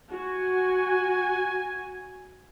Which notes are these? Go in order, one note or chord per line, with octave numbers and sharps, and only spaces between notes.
F#4 G#5